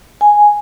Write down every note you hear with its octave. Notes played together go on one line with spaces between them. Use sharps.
G#5